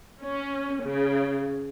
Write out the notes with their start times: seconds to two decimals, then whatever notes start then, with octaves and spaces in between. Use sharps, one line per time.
0.20 C#4
0.83 C#3